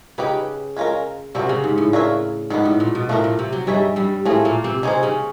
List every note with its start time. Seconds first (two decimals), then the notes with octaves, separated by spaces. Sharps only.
0.18 C#3 D#4 G4 B4
0.76 G#3 C#4 F4 A#4
1.35 C3 G3 C4 D#4 F#4 A#4
1.49 C#3
1.64 G#2
1.78 A2
1.93 D4 F4 A#4 C#5 E5
2.50 G#2 D#3 G3 B3
2.65 A2
2.80 A#2
2.95 B2
3.09 A2 F3 A3 D4 F#4 A#4
3.24 A#2
3.39 C3
3.53 F#3
3.67 G2 G3 D#4 G#4 C#5 E5
3.96 G2 G3
4.25 A2 A3 C4 F4 G#4
4.45 A#2 A#3
4.64 C3 C4
4.83 C#3 C#4 D#4 G#4 C5
5.03 C#3 C#4